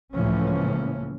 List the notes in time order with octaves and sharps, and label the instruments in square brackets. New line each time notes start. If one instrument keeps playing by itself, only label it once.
[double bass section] C#2 A2 E3 F3 A#3 C#4